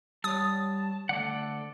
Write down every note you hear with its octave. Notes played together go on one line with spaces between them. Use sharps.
G3 C#5 A5 D#6
D3 A3 A4 D5 F#5